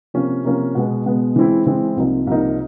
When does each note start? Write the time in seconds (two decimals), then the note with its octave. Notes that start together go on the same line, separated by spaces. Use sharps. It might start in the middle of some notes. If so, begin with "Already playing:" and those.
0.14 C3 F3 A#3 C#4
0.44 C3 F3 A#3 C#4
0.75 B2 G#3 B3
1.06 B2 G#3 B3
1.36 E3 G#3 C4 E4
1.66 E3 G#3 C4 E4
1.97 C2 C3 F3 A#3 D#4
2.27 C2 C3 F3 A#3 D#4